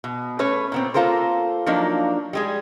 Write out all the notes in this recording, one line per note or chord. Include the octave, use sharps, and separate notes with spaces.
B2
A3 C#4 B4 C#5
A#2 B3 C4
A#3 F4 A4 A#4 C5
F3 F#3 A#3 D4 D#4
G3 G#3 G#4